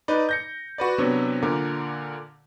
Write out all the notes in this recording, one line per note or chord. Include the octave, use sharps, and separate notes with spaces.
D#4 B4 D5
G6 A#6 C#7
F#4 B4 D5
C3 F#3 B3 D4
A#2 D3 A#4 D6